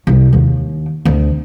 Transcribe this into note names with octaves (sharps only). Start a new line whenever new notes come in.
C2
D#2
D2